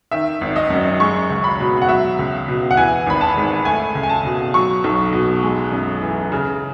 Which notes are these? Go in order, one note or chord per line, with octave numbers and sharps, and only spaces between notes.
D#3 E5
G#1
D#5
F#2
G#3 C#6
C#2
B5
B2
F#5
F#3 E5
C#2
B2
F#5
E3 G#5
G#1 B5
A5
G#2
A3 G#5
C#2
G#5
A5
B2
F#3 C#6
B1
B2
G#3
F#2
E3
C#3